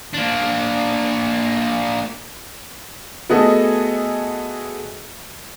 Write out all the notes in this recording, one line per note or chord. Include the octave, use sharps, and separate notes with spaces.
A#3 D4
A3 B3 F#4 G#4 A4 D#5